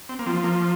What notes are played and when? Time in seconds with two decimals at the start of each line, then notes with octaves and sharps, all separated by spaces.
0.09 C4
0.19 A#3
0.26 F3 C4
0.44 A#3